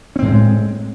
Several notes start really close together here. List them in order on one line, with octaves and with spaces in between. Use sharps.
C#4 C4 A2 G#3